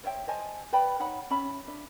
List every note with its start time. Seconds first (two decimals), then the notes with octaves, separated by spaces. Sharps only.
0.04 C5 C#5 E5 G5
0.27 C5 D#5 G#5 A5
0.73 B4 D5 G5 B5
1.00 D#4 C#5 F#5 B5
1.30 C#4 E5 A5 B5
1.67 D4 E5